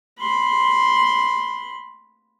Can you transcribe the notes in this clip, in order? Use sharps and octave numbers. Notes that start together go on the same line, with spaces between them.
B5 C6